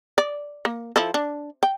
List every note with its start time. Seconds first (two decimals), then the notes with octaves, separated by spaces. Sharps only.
0.18 D5
0.65 A#3
0.96 F3 E4 A4
1.14 D4
1.63 G5